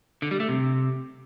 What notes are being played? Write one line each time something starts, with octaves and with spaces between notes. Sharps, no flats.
D3
G3
A3
C3